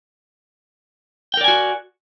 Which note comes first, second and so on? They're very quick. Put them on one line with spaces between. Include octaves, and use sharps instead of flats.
G5 A#4 D5 G#5 F#4